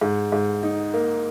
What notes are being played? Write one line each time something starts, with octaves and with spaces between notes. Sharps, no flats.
G#2
G#2
D#4
A#3